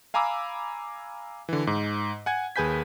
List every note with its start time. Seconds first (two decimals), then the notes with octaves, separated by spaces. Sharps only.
0.14 F5 G#5 A#5 B5 D6 E6
1.49 D3 E3
1.67 G#2
2.26 F#5 G#5 G#6
2.56 D#2 G#4 B4 G#5 G6 B6